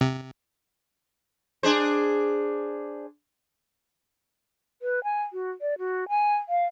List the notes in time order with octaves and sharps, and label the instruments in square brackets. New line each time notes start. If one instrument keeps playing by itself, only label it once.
[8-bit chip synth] C3
[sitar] D4 G#4 C5
[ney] B4
G#5
F#4
D5
F#4
G#5
F5